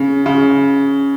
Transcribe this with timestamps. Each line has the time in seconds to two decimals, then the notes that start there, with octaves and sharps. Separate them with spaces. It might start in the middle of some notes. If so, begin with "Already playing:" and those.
Already playing: C#3
0.26 C#3